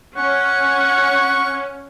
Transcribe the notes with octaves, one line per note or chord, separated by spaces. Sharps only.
C#4 F#5 C#6